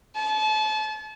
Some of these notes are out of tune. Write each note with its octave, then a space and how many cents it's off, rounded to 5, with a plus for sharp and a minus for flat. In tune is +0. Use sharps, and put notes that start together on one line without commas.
A5 -35